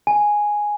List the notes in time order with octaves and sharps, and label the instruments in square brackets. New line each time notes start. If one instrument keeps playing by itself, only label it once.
[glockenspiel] G#5